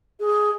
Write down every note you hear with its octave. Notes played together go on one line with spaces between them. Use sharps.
G#4